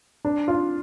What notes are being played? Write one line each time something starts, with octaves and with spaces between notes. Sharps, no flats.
D4
F4